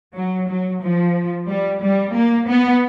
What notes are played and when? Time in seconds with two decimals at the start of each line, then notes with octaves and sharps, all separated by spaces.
0.15 F#3
0.48 F#3
0.81 F3
1.48 G3
1.81 G3
2.15 A#3
2.48 B3